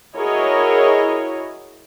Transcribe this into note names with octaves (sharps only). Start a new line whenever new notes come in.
E4 F#4 G#4 A#4 C#5 D#5